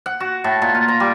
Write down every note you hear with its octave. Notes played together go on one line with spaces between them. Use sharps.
F#5
F#4
A2
A#2
F4
A#5
G3